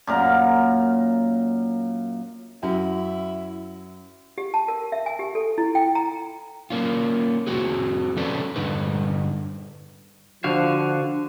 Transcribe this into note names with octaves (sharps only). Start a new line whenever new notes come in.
F#2 A#2 A#4
F#2 E4
G4
A5
A#4
E5
G#5
G4
A4
E4
G5
A#5
A#3 C#4 F4
F2 C4 F#4 G#4
F3 C#4 A4 B4 C#5 D5
G2 D3 D#4 B4
D3 F3 F#4 F5